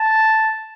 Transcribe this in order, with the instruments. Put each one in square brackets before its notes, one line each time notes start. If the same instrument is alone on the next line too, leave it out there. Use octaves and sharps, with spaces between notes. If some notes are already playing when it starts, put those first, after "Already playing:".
Already playing: [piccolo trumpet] A5